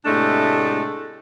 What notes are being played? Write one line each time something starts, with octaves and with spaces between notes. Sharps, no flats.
A2 C3 G#3 A3 D4